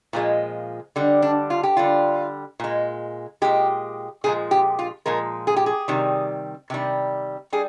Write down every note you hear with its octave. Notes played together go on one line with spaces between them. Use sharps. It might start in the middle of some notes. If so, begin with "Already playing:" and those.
A#2 F3 G#3
D3 G3
D4
F4
G4
D3 G3 F4
A#2 G#3
A#2 G#3 G4
A#2 F3 G#3 G#4
G4
F4
A#2 F3 G#3 A#4
G#4
G4
G#4
C3 D#3 G3
C3 D#3 G3
G3 G#4